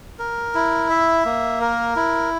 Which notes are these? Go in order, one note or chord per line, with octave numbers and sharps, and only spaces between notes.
A#4
E4
E5
A#3
A#4
E4